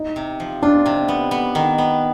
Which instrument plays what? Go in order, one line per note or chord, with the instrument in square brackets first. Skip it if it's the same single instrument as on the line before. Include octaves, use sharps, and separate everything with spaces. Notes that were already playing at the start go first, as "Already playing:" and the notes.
Already playing: [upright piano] D#4
[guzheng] C3
F3
[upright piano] D4 [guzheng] F4
[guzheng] C3
B3
B3
D#3
B3